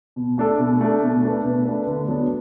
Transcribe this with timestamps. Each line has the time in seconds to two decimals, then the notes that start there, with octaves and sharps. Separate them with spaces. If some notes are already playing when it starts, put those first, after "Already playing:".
0.16 B2
0.38 A3 D4 A4
0.59 B2
0.81 A3 D4 A4
1.03 B2
1.23 A3 D4 B4
1.44 B2
1.66 A3 D4 B4
1.87 D3
2.08 F#3 B3 D4